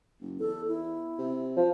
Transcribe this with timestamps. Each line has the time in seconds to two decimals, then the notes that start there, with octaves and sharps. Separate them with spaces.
0.21 F#1
0.39 E2 A4
0.68 E4
1.18 C3
1.57 F3